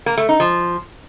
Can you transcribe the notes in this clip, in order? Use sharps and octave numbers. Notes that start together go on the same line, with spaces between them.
A#3
A3
D#4
F3